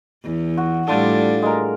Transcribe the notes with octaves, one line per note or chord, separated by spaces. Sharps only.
E2
F#4
A2 G3 D4 F4 A4
G#3 A#4